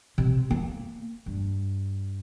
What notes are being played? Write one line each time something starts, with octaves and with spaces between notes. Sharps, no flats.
C3
A#3
G2